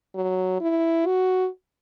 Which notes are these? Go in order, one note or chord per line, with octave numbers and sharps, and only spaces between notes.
F#3
E4
F#4